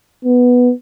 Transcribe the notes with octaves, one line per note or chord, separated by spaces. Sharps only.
B3